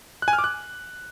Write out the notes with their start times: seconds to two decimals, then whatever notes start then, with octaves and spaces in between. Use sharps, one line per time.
0.22 F#6
0.28 G#5
0.33 F6
0.38 D6
0.44 F#6